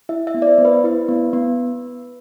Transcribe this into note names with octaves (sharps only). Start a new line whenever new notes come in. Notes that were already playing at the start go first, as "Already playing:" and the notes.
E4 E5
E5
B3
D5
C5
B3
B4
E4 B4
B3
B3